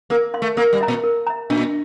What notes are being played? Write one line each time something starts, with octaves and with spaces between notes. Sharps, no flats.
A#3 A#4
F5 C6
A3
A#3 A#4
G3
E5 A#5
A#2
A#4
E5 A#5
A#2 D4